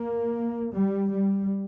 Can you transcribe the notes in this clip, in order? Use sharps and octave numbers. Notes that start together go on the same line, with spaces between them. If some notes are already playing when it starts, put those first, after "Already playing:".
Already playing: A#3
G3
G3